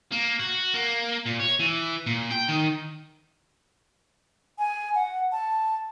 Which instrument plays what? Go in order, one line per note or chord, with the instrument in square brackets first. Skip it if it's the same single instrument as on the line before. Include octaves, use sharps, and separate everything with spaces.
[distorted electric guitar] A#3
F#4
A#3
A#2
C#5
E3
A#2
G5
D#3
[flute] G#5
F#5
A5